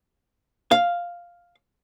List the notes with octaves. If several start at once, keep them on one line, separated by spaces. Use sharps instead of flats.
F5